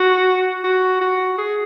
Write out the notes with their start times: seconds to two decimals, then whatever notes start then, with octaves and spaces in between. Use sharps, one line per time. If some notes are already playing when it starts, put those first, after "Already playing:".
Already playing: F#4
0.64 F#4
1.01 F#4
1.38 G#4